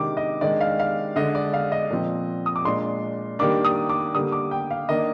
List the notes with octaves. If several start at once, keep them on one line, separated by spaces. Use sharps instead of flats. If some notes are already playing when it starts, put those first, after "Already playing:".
Already playing: C3 D#3 G#3 D4 D6
D#5
D#3 G#3 D4 D5
F5
F5
D3 G#3 D4 D#5
D5
F5
D#5
A#2 F3 C4
D#6
D6
A#2 G#3 D4 C6
D#3 G3 A#3 D4 D6
D#6
D6
D3 G3 A#3 D#6
D6
G5
F5
D#3 A#3 D4 D#5